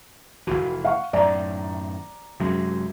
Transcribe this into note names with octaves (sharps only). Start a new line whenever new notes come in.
F1 A#1 E3 F#4
F5 F#5 C#6
F#2 A2 D#3 D5 A#5
F#2 C3 G#3